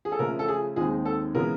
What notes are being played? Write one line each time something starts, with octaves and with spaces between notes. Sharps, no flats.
G#4
A4
C#3 F3 A3 A#4
A4
G#4
D#2 D#3 G#3 C4 D#4 G#4
A4
C#3 E3 G#3 B3 A#4